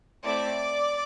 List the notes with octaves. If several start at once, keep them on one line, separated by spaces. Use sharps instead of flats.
A3 C4 E4 D5 D6